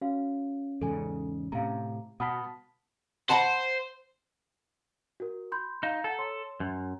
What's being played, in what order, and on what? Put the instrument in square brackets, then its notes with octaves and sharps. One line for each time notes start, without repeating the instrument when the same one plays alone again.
[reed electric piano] C#4 [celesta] F#4 F5
[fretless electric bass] E2 G#2 C#3 [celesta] A4 G#5
[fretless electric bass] A2 C3 [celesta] F5 A#5
[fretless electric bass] B2 [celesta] F#5 F6 B6 [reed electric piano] A5 B5 D#6
[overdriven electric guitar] C5 [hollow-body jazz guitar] F#5 A5 B5
[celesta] F#4 A#4
B5 C6 G6
[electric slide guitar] D#4 [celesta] F5 E7
[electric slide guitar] A4 [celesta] F#5 A#5
[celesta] C#5 C6
[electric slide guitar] F#2